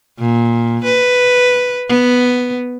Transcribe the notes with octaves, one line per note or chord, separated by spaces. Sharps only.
A#2
B4
B3